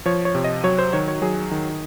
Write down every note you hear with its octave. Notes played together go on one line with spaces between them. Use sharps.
F3 C#5
C#5
C3
D#5
F#3 C#5
C5
D#3 C#5
C#5
F#3 G#4
D#3